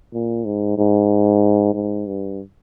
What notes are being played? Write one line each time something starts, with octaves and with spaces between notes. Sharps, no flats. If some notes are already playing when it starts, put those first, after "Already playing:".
A#2
G#2
G#2
G#2
G2